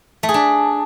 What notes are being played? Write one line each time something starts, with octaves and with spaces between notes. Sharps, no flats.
A3
G#4
D4